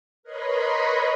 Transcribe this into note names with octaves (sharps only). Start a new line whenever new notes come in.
A#4 B4 C#5 D#5 B5 C6